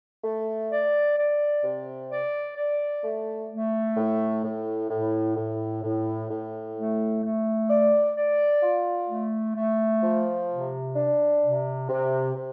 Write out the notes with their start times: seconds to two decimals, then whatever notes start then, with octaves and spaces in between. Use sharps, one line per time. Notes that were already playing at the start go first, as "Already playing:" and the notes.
0.24 A3
0.70 D5
1.18 D5
1.64 C3
2.10 D5
2.57 D5
3.04 A3
3.50 A3
3.97 A2
4.44 A2
4.90 A2
5.36 A2
5.83 A2
6.30 A2
6.76 A3
7.23 A3
7.69 D5
8.16 D5
8.63 F4
9.09 A3
9.56 A3
10.03 F3
10.49 C3
10.95 D4
11.42 C3
11.89 C3
12.35 C3